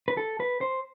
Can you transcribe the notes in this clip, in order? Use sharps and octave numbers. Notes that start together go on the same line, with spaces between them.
B4
A4
B4
C5